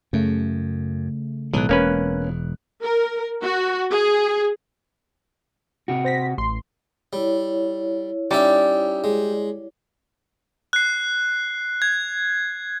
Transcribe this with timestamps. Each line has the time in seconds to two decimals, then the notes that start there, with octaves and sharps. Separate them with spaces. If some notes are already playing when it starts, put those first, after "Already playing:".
0.13 F#2 C#3 A3
1.53 B1 A2 D#3 G#3 F#6
1.69 E1 A#3 C#4 B4
2.82 A#4
3.43 F#4
3.91 G#4
5.88 C3 F#4
6.05 C5 A#6 B6
6.38 A1 C6
7.13 G3 E4 C#5
8.31 G3 C#4 D#4 E5
9.04 G#3
10.73 F#6 C7
11.82 G#6